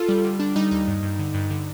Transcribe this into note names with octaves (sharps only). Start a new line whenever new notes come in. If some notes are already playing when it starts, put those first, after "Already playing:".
Already playing: F4 A4
G3
D3
G3 D4
G3 D#4
D#2 D#4
G2
G2
D3
G2
D3